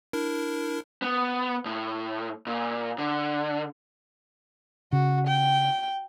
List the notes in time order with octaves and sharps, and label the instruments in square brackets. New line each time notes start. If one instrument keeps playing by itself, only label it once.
[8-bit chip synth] D4 E4 A#4
[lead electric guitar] B3
A2
A#2
D3
[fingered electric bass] C#3 [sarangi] F#4
[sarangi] G5